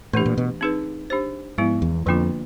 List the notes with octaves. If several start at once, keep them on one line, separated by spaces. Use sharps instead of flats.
A2 E3 A3 D4 G4
A#2
B2
C4 D#4 G#4 B4
D4 G4 C5
G#2 F3 G#3 B3 E4
E2
F2 D3 F3 A#3 D4 F4